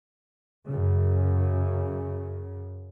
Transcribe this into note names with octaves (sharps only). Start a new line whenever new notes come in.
F#2 C#3